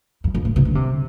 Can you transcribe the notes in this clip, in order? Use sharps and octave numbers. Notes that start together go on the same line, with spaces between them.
F2
F2
A2
C3
D3
C3